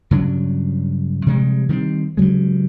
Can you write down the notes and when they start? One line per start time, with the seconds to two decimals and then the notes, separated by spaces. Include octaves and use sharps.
0.11 G2 C#3 F#3 D4
1.26 C3 F3 G3 G#3
1.69 D#3 G3 A#3 C4
2.17 G2 C#3 F#3 G#3